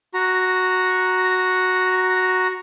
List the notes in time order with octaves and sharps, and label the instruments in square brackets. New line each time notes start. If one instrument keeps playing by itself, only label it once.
[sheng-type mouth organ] F#4 A#5